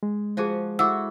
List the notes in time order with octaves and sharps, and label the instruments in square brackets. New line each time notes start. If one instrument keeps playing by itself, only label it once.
[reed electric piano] G#3
[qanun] F3 F#4 G#5 [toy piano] G#4 C5
[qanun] E4 F#4 A4 [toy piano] F#5 D6 [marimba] E6